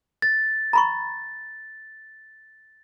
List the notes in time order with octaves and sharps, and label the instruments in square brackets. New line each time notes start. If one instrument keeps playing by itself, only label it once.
[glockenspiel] A6
[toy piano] A#5 B5 C#6